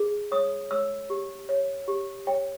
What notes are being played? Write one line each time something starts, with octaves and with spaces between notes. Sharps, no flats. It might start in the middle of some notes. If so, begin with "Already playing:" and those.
Already playing: G#4
C#5 D#6
C#5 E6
G4
C#5
G4
C#5 G5